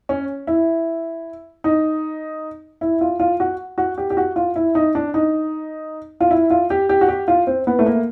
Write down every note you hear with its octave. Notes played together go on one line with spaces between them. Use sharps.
C#4
E4
D#4
E4
F4
F4
F#4
F#4
G4
G4
F#4
F4
E4
D#4
D4
D#4
F4
E4
F4
G4
G4
F#4
G4
F4
C4
B3
A3
A#3